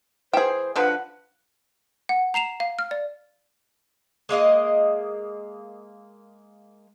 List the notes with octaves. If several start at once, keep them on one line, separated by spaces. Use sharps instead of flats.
E3 G#4 C5 G5
D3 F3 B4 F#5
F#5
A#5 C7 E7 F7
F5
F6
D5
G#3 A#3 D#5 F5